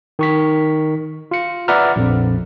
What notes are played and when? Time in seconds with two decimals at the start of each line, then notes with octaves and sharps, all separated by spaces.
0.19 D#3 C#6 B6
1.31 F4 C#7
1.68 B4 D5 E5 F#5 A#5 F6
1.96 A#1 F2